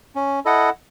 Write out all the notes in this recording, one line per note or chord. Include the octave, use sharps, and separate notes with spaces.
C#4
E4 A4 D#5 F#5